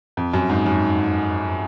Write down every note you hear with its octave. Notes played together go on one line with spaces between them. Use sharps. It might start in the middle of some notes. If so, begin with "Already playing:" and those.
F2
F#2
G#2
F#2